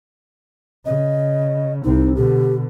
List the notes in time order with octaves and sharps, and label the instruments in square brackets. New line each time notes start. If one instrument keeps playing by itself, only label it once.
[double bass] C#3 [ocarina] D#5
[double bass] C2 C4 [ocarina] D#4
[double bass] B2 D3 [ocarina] G4